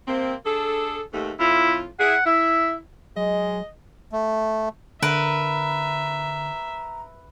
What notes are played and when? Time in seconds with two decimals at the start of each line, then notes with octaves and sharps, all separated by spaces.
0.08 C3 A#3 C4
0.45 D4 G#4 A4
1.13 D#2 G#2 A3
1.40 F2 A2 E4 F4
2.00 E4 G#4 F#5
2.26 E4 E5
3.16 F#3 G#3 D#5
4.12 A3
5.02 D3 A#4 B4 E5 A#5